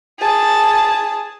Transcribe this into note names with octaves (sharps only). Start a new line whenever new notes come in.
G#4 A5